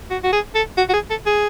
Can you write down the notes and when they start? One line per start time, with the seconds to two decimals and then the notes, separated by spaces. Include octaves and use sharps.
0.10 F#4
0.24 F#4
0.33 G#4
0.55 A4
0.77 F#4
0.89 F#4
0.93 G#4
1.10 A4
1.26 G#4